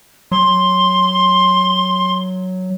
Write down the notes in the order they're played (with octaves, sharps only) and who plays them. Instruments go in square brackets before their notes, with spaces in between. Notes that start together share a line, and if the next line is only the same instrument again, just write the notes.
[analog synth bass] F#3 [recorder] C6